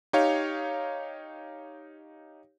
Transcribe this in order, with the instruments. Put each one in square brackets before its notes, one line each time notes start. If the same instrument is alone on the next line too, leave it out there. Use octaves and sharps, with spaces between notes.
[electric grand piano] D#4 G4 C#5 F5